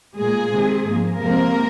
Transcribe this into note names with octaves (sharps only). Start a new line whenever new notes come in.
A#2 G#3 A#3 G#4
C3 D#3 G#3 C4
G#2 F3 A#3
F2 C3 G#3 A#3 C4 A#4